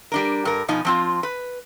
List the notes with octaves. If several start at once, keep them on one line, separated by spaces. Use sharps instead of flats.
G3 D4 A#4
G2 A#4
B2 F3 D#4 G#5
F3 C4 F4
B4